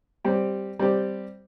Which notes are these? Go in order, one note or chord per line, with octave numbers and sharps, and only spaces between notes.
G3 C4 G4
G3 C4 G4